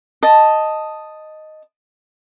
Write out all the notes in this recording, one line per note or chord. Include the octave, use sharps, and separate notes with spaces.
D#5 A5